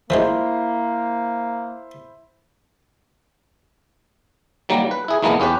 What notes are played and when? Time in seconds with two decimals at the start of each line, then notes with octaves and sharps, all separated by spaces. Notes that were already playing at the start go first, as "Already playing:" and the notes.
0.10 E3 F3 G#3 A#3 E4 C5
4.69 D#3 F#3 G3 A#3
4.91 B4
5.08 E4 G#4
5.22 B1 E3 G#3 A#3 B3
5.40 E2 C#4 G4 B4